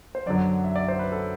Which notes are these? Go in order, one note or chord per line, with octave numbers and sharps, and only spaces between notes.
C5
F#2 D3 F#3 D5
E5
D5
C5
B4
A4